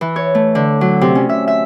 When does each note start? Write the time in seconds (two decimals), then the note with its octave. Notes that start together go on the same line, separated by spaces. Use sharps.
0.01 E3
0.16 C#5
0.35 A3
0.55 D3
0.81 F#3
1.01 C3
1.15 C#4
1.29 E5
1.48 E5